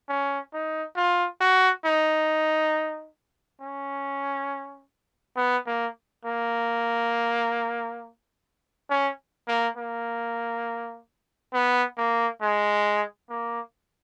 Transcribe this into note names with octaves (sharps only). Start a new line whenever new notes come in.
C#4
D#4
F4
F#4
D#4
C#4
B3
A#3
A#3
C#4
A#3
A#3
B3
A#3
G#3
A#3